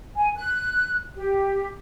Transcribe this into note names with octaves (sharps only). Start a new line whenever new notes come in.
G#5
F#6
G4